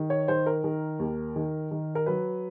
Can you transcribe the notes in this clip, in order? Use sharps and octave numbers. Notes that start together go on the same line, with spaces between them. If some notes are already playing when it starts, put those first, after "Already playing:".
Already playing: D#3
C#5
D#3 C5
A#4
D#3
D#2
D#3
D#3
A#4
F#3 B4